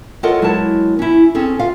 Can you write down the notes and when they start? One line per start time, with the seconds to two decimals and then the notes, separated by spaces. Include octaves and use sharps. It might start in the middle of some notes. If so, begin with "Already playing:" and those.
0.23 F4 A4 A#4 C#5 D#5 F#5
0.42 F#3 G#3 E4 A#4 A5
0.99 C#4 E4
1.35 C4 C#4 G#4 A4
1.59 F4 F5